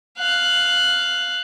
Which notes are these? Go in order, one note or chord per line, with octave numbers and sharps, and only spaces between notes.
F5 F#6